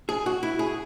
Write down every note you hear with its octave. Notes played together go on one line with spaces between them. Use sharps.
G#4
F#4
E4
G#4